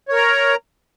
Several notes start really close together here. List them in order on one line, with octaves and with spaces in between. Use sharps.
C#5 A#4 A#5